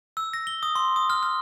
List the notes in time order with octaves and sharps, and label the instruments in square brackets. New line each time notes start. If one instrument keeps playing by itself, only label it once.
[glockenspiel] E6
A#6
G7
D#6
C6
D#6
F6
F6